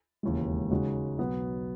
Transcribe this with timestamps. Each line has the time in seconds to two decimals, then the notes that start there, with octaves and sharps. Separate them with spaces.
0.23 E1 D#2 C#3 E3 G#3
0.71 C#3 G#3 D#4 F#4
1.18 B1 B2 F#3 B3 F#4